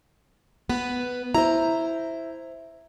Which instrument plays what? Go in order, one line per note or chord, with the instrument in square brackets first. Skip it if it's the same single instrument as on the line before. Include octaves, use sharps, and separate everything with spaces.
[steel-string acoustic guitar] B3 B4
[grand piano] E4 [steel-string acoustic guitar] C5 A#5